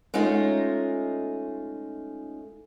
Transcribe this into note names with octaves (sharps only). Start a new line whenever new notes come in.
G#3 A3 C#4 D#4 F4